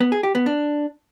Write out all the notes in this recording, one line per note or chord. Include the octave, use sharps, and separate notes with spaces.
B3
G#4
G4
B3
D4